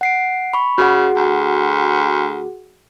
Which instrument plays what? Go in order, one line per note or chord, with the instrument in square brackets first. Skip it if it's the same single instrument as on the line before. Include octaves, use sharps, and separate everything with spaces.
[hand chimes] F#5 C7 D7
B5 C#6
[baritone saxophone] C#3 [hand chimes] F#4 G#4 F#5
[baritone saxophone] D2